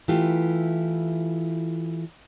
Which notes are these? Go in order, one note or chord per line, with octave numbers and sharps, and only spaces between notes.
E3 A3 E4 F4 G4